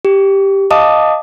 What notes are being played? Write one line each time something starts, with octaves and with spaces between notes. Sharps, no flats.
G4
D#5 F5 A5 D6 D#6